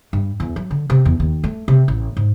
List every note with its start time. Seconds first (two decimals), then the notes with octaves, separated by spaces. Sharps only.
0.13 G2
0.40 E2
0.56 F#3
0.71 D3
0.90 C3
1.05 E2
1.20 D#2
1.44 A3
1.68 C3
1.88 A1
2.17 G#2